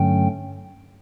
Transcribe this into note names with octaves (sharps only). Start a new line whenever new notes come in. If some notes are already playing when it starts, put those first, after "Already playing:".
Already playing: G2 D3 F#3 A3 C#4 G5